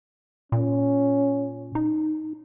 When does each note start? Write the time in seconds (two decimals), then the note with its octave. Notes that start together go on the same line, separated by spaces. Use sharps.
0.52 A#2 C#4
1.75 D#4